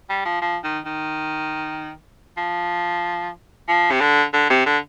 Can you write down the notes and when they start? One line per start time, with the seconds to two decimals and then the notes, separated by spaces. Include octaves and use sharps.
0.09 G3
0.25 F3
0.42 F3
0.64 D#3
0.85 D#3
2.37 F3
3.68 F3
3.91 C3
4.00 D3
4.33 D3
4.50 C3
4.66 D3